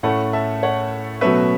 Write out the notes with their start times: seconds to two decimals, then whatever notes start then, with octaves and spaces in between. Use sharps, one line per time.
0.03 A2 A3 C#4 F#5 B5
0.33 E5 A5
0.63 C#5 F#5
1.21 B2 F#3 A3 C#4 B4 E5